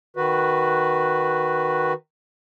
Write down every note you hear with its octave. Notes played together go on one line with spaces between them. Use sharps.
D#3 F#4 B4